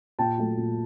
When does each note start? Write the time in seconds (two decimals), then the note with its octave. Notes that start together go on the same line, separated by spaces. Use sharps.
0.19 A#2 G5 A5
0.38 F#3 A3
0.57 A#2